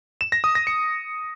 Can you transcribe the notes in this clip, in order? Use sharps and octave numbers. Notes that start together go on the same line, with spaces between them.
E7
A#6
D#6
A#6
C#7